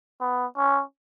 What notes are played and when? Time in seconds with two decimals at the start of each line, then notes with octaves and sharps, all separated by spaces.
0.21 B3
0.57 C#4